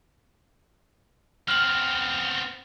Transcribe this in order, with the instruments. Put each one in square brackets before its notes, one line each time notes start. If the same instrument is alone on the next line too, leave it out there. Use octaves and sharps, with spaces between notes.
[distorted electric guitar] B3 C4 [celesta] F6 F#7